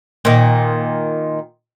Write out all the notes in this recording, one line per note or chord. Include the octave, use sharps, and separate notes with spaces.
A#2 D#3